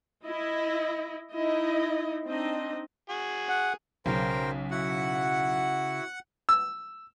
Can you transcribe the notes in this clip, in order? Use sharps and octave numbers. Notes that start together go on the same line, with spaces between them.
E4 D#5
D#4 E4 D#5
C4 D4 D#4 D#5
F#4 G#4
F#5
B1 C#3 A#4 C5 G5
E4 F#4 F#5
E6